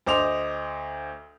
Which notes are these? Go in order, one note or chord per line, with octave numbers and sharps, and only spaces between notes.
D2 C5 D#5 D6 F7